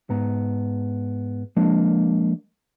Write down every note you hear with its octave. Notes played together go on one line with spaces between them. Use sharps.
G#2 B3 A#5
F3 G#3 A#3 D4